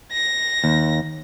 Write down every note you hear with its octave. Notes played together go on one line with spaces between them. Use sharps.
A#6
D#2